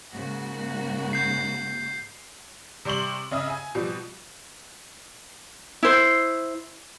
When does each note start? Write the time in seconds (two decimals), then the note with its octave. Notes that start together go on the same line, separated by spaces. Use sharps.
0.13 G#2 C#3 A#3 F#4
1.13 G6 C7
2.85 C3 G3 C6 C#6 F#7
3.31 C#3 D#5 E5 D#6
3.50 G#5
3.75 B2 F3 G3
5.83 E4 C5